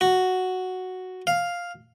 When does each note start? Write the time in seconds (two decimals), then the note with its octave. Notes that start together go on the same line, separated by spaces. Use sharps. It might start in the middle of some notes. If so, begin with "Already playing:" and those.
0.01 F#4
1.27 F5